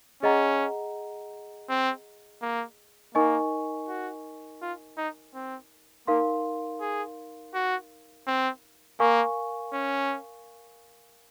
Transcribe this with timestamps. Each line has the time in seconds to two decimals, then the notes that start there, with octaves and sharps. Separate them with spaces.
0.23 C#4 G#4 D#5 F#5 A#5
1.69 C4
2.42 A#3
3.15 A#3 D#4 A#4 D#5 G#5 C#6
3.88 F#4
4.62 F4
4.97 D#4
5.34 C4
6.07 A#3 D#4 A#4 F5 C6
6.81 G#4
7.54 F#4
8.27 C4
9.00 A#3 A#4 F5 G#5 C#6
9.73 C#4